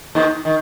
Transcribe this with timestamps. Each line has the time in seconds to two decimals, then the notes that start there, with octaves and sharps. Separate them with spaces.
0.15 D#2 D#3
0.45 D#3